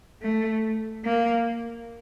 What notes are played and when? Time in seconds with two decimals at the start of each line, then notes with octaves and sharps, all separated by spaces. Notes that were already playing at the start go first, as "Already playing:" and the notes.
0.22 A3
1.05 A#3